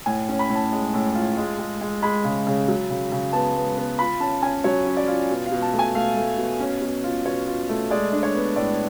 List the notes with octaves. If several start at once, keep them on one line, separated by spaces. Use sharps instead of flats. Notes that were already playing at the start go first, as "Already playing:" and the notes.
A2 G#5
C#4
B5
A2
A5
G#3
A2
F4
G#3
G#3
G#3
G#3 B5
C#3
C#3
F#3
C#3
C#3
B3 A5
B3
B3
F4 B5
C#4 A5
C#4 G#5
F#3 C#5
C#4
D5
F4
B2
F5
B2
A5
A3
G#5
A3 F5
A3
B2
C#4
B2
F4
B2 C#5
F4
A3
G#3 D5
D4
C#5
B3
A2 D5